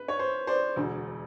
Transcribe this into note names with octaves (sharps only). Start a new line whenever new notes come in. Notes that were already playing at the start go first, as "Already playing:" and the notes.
Already playing: B4
C#5
C5
C5 D5
E1 D2 D3